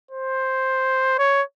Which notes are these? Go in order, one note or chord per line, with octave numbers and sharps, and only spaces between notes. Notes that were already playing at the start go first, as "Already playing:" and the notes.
C5
C#5